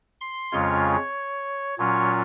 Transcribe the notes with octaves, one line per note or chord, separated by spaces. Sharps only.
C6
F2 C#3 G#3 C#4 F4 C#5
A#2 F#3 C#4 F4 C#5